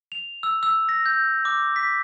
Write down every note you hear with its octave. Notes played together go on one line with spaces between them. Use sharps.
F7
E6
E6
A#6
G6
D6
B6